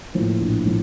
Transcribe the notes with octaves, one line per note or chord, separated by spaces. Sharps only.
A2 F3 A#3
A#1
A2 F3